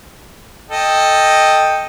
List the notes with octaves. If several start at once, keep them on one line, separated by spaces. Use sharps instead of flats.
A4 D#5 G5